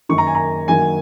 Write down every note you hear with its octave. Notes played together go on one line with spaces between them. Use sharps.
F#2 D#3 A#3 C#6
A#5
G#5
A#5
F#2 D#3 F#3 A#3 G#5